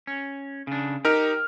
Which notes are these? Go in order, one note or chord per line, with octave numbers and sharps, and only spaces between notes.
C#4
C#3 D4
D#4 G4 A#4 F6